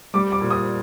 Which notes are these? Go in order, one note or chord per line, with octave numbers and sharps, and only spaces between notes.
G3 D6
D6
A#2
D#6